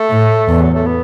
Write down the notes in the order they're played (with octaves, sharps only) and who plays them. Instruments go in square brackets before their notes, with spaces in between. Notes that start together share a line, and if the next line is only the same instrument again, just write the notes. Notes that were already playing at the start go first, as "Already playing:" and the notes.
Already playing: [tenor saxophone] A3
[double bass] A2
E2
[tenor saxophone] F#3
A3
B3